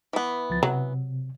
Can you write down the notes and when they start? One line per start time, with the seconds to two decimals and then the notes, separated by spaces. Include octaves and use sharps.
0.13 E3 B3
0.50 C#2 F3 A6
0.63 C3 F#3